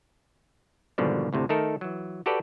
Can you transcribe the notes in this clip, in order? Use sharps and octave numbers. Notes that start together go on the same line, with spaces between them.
G#1 G#2 B2 D3 F3 G3
D2 A2 C3
D#3 A3 D#4 A4 A#4
E3 F#3
F#4 G4 A4 B4 D5 G5